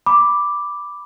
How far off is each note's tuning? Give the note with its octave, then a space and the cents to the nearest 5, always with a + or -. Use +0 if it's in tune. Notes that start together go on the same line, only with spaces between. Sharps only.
B5 +0 D6 +0